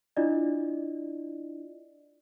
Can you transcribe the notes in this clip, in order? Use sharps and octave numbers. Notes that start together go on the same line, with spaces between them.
D4 E4 F4 D5 D#5